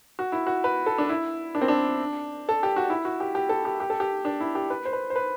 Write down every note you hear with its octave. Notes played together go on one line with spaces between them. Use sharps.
F#4
E4
F#4
B4
A4
D4
E4
D4
C4
D4
A4
G4
F#4
E4
F#4
G4
G4
A4
G4
G4
A4
G4
D4
E4
G4
B4
C5
B4
C5
B4